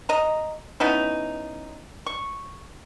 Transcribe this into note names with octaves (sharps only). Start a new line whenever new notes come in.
D#5 A#5
B3 C#4 D#4 E4
C#6